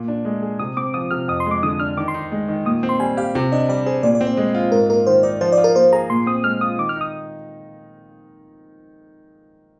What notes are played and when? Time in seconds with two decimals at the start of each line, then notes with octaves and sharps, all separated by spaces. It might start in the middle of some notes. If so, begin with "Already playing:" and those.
Already playing: A#2
0.08 D4
0.25 G#3
0.42 G#4
0.59 C3 D#6
0.77 C4 D6
0.94 F3 D#6
1.11 C3 F6
1.28 F2 D#6
1.40 C6
1.46 G#3 D6
1.63 D3 D#6
1.80 D4 F6
1.97 D#3 D6
2.08 C6
2.14 D#4
2.32 G#3
2.48 D#3
2.65 A#2 D#6
2.83 C4
2.89 C6
3.00 G3 G#5
3.17 G4 F5
3.35 C3
3.52 D4 D#5
3.69 G3 D5
3.86 G#4 C5
4.03 A#2 D5
4.15 D5
4.21 C4
4.27 C5
4.37 G#3
4.55 F4
4.72 G#2 A#4
4.89 A#3 A#4
5.07 D#3 C5
5.23 D#4 D5
5.41 F3 C5
5.52 D5
5.57 F4
5.64 A#4
5.75 A#3 C5
5.93 G#4 A#5
6.10 A#2 C6
6.26 C4 D#6
6.44 G#3 F6
6.61 F4 D#6
6.78 D#3 D6
6.89 F6
6.96 D#4 D#6